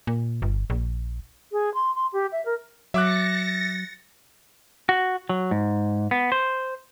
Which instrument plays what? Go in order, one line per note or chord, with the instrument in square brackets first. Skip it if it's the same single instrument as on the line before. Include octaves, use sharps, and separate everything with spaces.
[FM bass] A#2
G1
A#1
[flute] G#4
C6
C6
G4
E5
A#4
[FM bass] F#3 [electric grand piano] E5 D6 F#6 [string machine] A6 A#6 C#7
[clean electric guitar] F#4
F#3
G#2
B3
C5